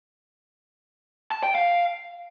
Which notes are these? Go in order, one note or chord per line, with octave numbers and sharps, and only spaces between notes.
A5
G5
F5